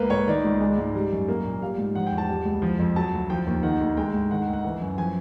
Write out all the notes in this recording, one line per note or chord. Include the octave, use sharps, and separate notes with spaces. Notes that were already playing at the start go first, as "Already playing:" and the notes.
Already playing: C#2 A#3 B4
A2 C#5
D#3 D5
C#2
G#3
G#2
G3
F#2
A#3
A#2
G3 F5
G#2
F3 F#5
G5
E2
A5
G3
C#2
F3
F2
F#3 A5
D2
F3 G5
D#2
D#3 F#5
D2
G#3 G5
G#2
D#3 F#5
F#5
D2
F#5
E3
F#2
F3 G#5